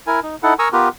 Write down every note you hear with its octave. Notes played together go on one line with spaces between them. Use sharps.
E4 A#4 G#5
D#4
D#4 E4 A4 F#5
A#4 G#5 A#5 C#6 D#6 E6
B3 F4 G4 A#4 B4